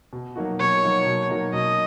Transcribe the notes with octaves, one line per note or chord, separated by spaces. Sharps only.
B2
F#3 A#3 D#4 F#4
B2 C#5
F#3 A#3 D#4 F#4
B2
F#3 A#3 D#4 F#4
B2 D#5